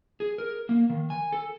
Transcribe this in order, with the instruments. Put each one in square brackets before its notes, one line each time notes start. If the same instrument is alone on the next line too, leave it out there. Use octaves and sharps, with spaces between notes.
[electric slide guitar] G#4
A#4
A#3
D#3
G#5
A4